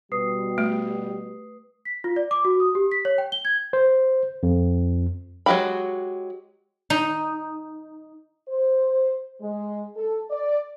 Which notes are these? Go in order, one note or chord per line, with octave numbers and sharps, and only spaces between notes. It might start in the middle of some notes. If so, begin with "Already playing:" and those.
B2 G3 B4 D#6 C7
A3
B6
F4
D5
D6
F#4
D#6
G4
B6
C#5
G5
G7
G#6
C5
F2
F#3 G#3 F#4 G4 B5
D#4
C5
G#3
A4
D5